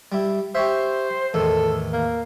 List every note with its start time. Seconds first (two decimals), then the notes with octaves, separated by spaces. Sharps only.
0.12 G3 E4
0.55 G4 C5 C#5 E5
1.34 E2 A2 D#3 A4
1.93 A#3